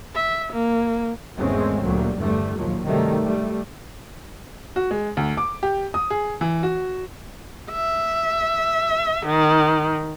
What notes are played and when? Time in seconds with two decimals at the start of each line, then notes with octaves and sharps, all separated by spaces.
0.15 E5
0.52 A#3
1.37 G#1 E2 G#3 A3 C4 C#4
1.82 D2 A#2 F#3 G3
2.16 E2 G2 D3 G3 A3
2.55 A#1 D#2 A#2 F3 F#3
2.84 G2 C3 D#3 F#3 G3 A3
3.24 G3 A3
4.76 F#4
4.91 G#3
5.17 D2
5.37 D6
5.63 G4
5.94 D#6
6.10 G#4
6.41 E3
6.63 F#4
7.71 E5
9.26 D#3